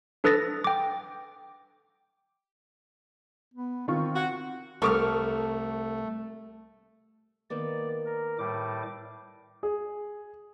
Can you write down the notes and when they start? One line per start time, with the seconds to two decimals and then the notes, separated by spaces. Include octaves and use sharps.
0.24 D4 A4 B4 D#6 A6 A#6
0.64 G5 D6
3.54 B3
3.88 D#3 C4 F4 C#6
4.15 F#4
4.82 C2 A3 A4 A#4 C#6 D6 F6
7.50 D#3 A#3 B3 D5
8.06 A#4
8.38 A2 G3 D6
9.63 G#4